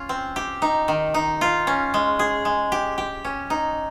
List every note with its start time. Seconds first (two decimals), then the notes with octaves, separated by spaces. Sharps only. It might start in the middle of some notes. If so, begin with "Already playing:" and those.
Already playing: C#4 F4
0.09 C4
0.36 G4
0.62 D#4
0.88 D#3
1.14 D#4
1.41 F4
1.67 C#4
1.94 G#3
2.19 G#4
2.45 G#3
2.72 G4
2.98 G4
3.25 C#4
3.50 D#4